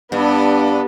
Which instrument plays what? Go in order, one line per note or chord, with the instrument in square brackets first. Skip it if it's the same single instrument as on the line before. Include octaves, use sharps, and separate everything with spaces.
[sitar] G2 [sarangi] B3 [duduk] D4